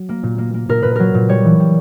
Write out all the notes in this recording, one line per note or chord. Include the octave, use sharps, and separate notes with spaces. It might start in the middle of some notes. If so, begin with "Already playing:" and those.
Already playing: F#3
A#3
A#2
A#3
A#3
A#2 A#4
A#2 B4
F#3 A#4
A#2
G3 C#5
E3
G3